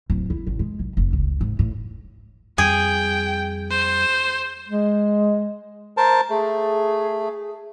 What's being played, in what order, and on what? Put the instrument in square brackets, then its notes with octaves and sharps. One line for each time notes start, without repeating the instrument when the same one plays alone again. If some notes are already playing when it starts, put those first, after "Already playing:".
[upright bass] D1
E4
A1
G#3
B1
F1
C#2
G#2
A2
[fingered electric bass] F2 G3 [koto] G#4 [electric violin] G5
[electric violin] C5
[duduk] G#3
[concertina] A#4 C5 A5
[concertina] A3 [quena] G#4